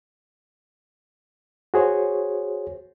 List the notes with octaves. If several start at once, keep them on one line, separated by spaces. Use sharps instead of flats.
F#4 G#4 C5 C#5